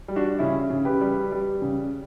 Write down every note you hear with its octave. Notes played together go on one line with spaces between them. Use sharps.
G3
D4 F#4
C#3 C#4 E4
C#3
G4 B4
G3
G3
C#3